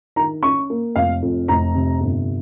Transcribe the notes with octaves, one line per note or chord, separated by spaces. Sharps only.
D#3 A#5
C#4 C#6
A#3
F1 F5
F2
F1 A#5
C3
G1